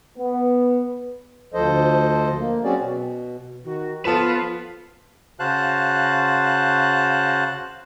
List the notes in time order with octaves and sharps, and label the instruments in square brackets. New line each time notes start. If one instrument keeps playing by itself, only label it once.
[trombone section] B3
[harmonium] D2 F3 A4 C5 D#5
A#3
F#3 C4 C#4 F#4 G#4 D5
B2
[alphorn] D#3 [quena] F#4
[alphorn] F3 [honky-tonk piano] B3 A4 E7 [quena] F4 [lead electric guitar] B4
[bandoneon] C#3 F#4 C5 F5 A5 F#6